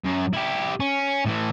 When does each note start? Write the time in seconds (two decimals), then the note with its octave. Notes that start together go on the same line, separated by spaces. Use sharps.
0.05 F#2
0.33 E4 G4
0.80 C#4
1.25 A2 E3